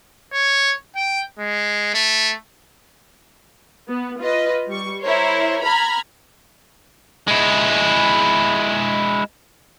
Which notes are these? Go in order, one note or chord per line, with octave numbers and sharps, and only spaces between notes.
C#5
G5
G#3
A3
B3
F4 B4 D#5
G3 C#6
E4 A#4 C5 C#5
A#5 B5 F6 G#6
G#3 E4